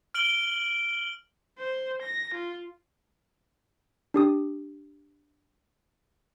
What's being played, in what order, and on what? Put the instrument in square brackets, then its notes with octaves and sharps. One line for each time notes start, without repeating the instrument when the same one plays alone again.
[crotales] F6 D7 F#7 G7
[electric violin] C5
A#6
F4
[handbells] D4 G4 D#6